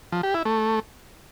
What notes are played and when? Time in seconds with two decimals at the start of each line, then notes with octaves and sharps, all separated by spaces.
0.12 F3
0.23 G4
0.34 E4
0.45 A3